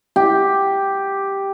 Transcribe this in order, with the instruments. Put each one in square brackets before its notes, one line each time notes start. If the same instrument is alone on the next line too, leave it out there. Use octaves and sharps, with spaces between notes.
[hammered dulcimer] G4